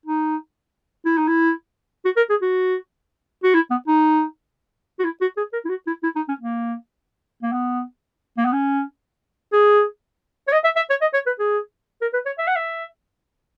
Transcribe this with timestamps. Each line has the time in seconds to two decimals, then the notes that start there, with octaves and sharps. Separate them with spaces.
0.06 D#4
1.05 E4
1.17 D#4
1.28 E4
2.05 F#4
2.17 A#4
2.30 G#4
2.42 F#4
3.43 F#4
3.55 E4
3.70 B3
3.88 D#4
4.99 F#4
5.04 E4
5.21 F#4
5.37 G#4
5.53 A#4
5.65 E4
5.70 F#4
5.87 E4
6.03 E4
6.16 D#4
6.28 C#4
6.40 A#3
7.42 A#3
7.52 B3
8.37 A#3
8.45 B3
8.52 C#4
9.53 G#4
10.48 C#5
10.52 D#5
10.64 E5
10.76 E5
10.90 C#5
11.01 D#5
11.14 C#5
11.26 B4
11.39 G#4
12.01 A#4
12.13 B4
12.26 C#5
12.38 E5
12.47 F#5
12.56 E5